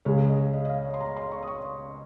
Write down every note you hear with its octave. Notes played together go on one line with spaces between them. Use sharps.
C#2 C#3 G#3 C#5
D#5
D#5
D#5
F5
C#5
C6
A#5
C6
C#6
D#6
C#6